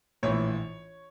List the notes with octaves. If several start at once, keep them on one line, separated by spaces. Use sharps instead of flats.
A#1 A2 E3 C#5